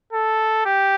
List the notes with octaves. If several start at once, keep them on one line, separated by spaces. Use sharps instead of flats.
A4
G4